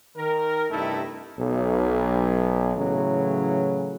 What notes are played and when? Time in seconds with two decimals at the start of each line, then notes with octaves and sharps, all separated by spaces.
0.17 D#3 A#4
0.71 G2 C3 A3 D#4 E4 A4
1.39 B1
2.77 A2 C#3 E3 F#3